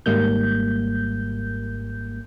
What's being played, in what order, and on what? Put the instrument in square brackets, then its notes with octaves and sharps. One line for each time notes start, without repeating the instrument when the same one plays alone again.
[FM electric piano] G#1 G#2 G3 A#3 G6